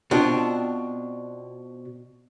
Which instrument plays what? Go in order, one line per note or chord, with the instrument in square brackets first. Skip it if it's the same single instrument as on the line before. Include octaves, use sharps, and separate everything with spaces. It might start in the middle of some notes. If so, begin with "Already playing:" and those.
[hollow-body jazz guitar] B2 C4 D4 F4